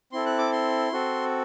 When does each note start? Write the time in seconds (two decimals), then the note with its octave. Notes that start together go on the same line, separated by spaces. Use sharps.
0.12 C4 E4 A4 C6
0.26 F#6
0.38 D6
0.52 C6
0.93 C4 F#4 A4